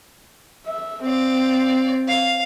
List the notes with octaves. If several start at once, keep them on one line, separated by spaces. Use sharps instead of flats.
E5
C4 D5 F5
F5